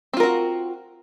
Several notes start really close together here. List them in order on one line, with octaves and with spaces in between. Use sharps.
C4 F4 A#4 F#4